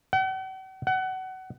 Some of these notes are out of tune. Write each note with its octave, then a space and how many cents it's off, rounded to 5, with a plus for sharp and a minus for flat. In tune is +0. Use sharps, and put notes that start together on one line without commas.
F#5 +45
F#5 +25